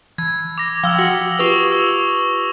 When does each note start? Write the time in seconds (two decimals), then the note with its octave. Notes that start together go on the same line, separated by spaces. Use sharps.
0.18 E3 G#6
0.58 D6 A#6
0.83 F3 F5 G5 D#6 E6 G7
0.99 F#4 F#5 A#6
1.39 F4 G4 B4 C#6 D#6 F7
1.71 E6